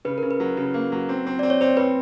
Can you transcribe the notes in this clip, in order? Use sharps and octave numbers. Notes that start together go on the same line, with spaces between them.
C#3 B4
C#3 A#4
B4
F#3
C#3
A#3
F#3
C4
C4
C4 D5
C#5
C4 C5
C4 B4